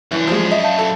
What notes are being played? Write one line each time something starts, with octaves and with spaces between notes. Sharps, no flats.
F#2 E3 D4
F3 G#3
D#5 E5
F5 A5 G6
A4